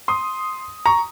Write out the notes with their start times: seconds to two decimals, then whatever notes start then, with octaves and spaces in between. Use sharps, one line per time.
0.08 C6 D#6
0.86 A#5 C#6